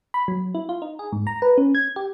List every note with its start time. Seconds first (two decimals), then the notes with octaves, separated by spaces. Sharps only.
0.14 B5
0.28 F#3
0.55 E4
0.69 F4
0.82 D#4
0.99 G#4
1.12 G#2
1.27 A#5
1.42 B4
1.58 C#4
1.75 G#6
1.96 G4